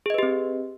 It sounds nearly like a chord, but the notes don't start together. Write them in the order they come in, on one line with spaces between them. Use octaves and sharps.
G#4 D#5 B4 G4 C4